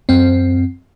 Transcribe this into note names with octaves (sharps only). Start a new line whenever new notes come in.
F#2 C4